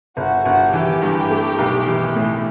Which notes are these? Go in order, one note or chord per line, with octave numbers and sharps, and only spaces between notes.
G1 F#4
G1 F#4
E3 G4
G2
A3
B1
E3
A2